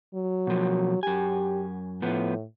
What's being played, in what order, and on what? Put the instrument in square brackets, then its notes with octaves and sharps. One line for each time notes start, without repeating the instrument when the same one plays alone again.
[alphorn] F#3
[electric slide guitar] B2 F3
[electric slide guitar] F#2 G#5 [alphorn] G4
[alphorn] A2 [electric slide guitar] F3 B3